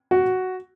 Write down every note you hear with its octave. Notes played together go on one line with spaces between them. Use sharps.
F#4